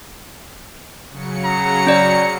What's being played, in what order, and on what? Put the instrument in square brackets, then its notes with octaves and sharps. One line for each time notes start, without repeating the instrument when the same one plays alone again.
[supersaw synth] C#3 F#3 C#7
[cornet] A#5
[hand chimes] C#4 D5